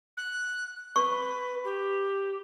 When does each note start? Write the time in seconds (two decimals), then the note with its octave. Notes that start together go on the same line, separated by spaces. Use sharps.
0.17 F#6
0.96 B4 C#6
1.64 G4